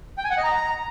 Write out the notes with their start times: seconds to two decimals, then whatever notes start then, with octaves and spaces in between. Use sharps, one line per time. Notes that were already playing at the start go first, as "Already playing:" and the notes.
0.18 G5
0.24 G#5
0.31 F#5
0.37 D#5
0.44 A#5